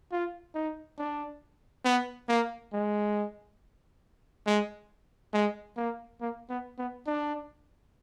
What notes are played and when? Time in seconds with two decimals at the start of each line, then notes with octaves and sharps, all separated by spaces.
0.11 F4
0.55 D#4
0.98 D4
1.85 B3
2.29 A#3
2.73 G#3
4.47 G#3
5.34 G#3
5.77 A#3
6.21 A#3
6.49 B3
6.78 B3
7.07 D4